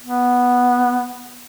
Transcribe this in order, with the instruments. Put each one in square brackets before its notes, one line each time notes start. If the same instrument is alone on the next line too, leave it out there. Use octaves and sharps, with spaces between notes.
[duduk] B3